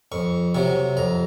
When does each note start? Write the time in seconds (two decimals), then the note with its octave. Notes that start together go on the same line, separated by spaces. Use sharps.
0.12 F2 C#6
0.54 C3 F#3 C#6
0.97 F2 A#5